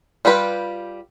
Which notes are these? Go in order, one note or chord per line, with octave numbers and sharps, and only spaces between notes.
G3 F4 G4 B4